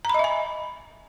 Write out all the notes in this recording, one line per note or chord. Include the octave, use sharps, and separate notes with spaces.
D#5 E5 G#5 A#5 B5